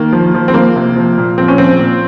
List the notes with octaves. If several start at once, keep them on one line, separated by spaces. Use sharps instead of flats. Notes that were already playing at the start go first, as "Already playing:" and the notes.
Already playing: D#3 A#3
F3
F3
C4
F3 A#3
C3
F3
A#2
F3 C4
C#4
F3 C4
A#2